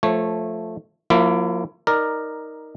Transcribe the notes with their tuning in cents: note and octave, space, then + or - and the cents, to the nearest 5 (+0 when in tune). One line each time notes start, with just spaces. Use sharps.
F3 +5 A3 +0 C#5 -20
F3 +40 A#3 +0 E4 +30
D#4 +5 A#4 +0 D5 +15